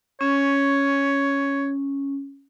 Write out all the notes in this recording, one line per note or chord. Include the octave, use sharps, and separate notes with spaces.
C#4 C#5